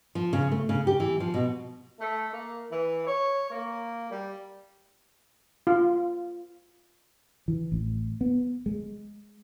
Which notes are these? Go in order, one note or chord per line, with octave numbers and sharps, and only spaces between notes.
F3
C#3
A3
C#3
G4
E3
F3
B2
A3
A#3
E3
C#5
A#3
G3
F4
E3
A1
B3
G#3